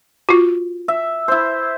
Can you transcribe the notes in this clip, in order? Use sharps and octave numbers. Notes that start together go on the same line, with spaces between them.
F4 F#4
E5
E4 C5